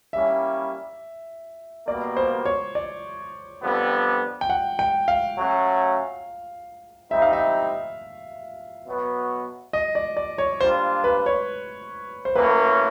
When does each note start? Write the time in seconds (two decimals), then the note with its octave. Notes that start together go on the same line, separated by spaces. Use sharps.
0.13 G3 A#3 C#4 E4 E5
1.87 B2 G3 A#3 D5
2.17 C5
2.45 C#5
2.75 D5
3.62 F2 D3 G3 B3
4.41 G5
4.50 F#5
4.79 G5
5.08 F5
5.37 F#3 A3 C#4 F#4
7.11 G3 C4 D#4 E5
7.22 F5
7.33 E5
8.86 B2 F#3 B3
9.73 D#5
9.95 D5
10.17 D5
10.38 C#5
10.60 G3 A#3 D4 F4 C5
11.04 B4
11.26 C#5
12.25 C5
12.35 A2 F#3 A#3 C#4 B4